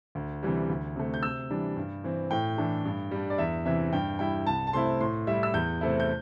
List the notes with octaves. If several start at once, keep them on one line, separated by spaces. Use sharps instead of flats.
D2
C3 E3 G3
D2
C3 A3
G6
C3 E6
E3 G3 D4
G2
E3 C4
A2 G5
E3 A3 D4
G2
G3 D4
D5
E2 E5
C3 E3 E5
G2 G5
G3 E4 G5
C2 A5
A5
C3 A3 C4 E4 C6
A2 C6
G3 E4 E5
E6
E2 G6
C3 A3 C4 E4
G6